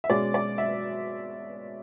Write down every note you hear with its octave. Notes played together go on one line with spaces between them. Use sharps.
E5
B2 G#3 C#4 D5
D5
E5